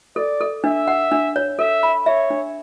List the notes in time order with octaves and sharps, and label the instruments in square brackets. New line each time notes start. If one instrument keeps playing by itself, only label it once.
[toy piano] A4 [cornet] D5
[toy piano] A4
[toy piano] D4 [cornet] E5
[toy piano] F#5
D4
C#5
[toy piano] A4 [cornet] E5
[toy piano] B5
[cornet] C#5 [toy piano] E5
[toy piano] D4